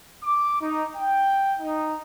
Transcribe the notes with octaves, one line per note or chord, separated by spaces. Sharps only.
D6
D#4
G5
D#4